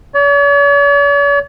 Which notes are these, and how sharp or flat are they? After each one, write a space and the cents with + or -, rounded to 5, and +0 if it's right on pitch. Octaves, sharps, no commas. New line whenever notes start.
C#5 +45